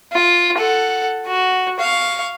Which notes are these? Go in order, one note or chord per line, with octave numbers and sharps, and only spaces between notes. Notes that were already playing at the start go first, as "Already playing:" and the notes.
F4
A4 F#5
F#4
F5 C#6